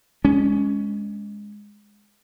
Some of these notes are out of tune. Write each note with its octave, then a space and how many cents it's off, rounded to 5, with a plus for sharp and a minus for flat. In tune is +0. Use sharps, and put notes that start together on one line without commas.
G#3 -5 C#4 +10